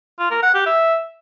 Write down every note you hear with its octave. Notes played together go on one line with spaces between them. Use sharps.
F4
A#4
F#5
G4
E5